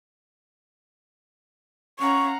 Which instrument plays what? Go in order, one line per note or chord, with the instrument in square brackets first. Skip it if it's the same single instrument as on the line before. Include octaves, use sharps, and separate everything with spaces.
[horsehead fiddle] C#4 [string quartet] F5 F#5 A#5 [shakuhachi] C#6